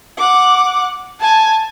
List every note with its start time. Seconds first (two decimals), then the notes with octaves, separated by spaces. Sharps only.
0.17 F#5 D6
1.20 G#5 A5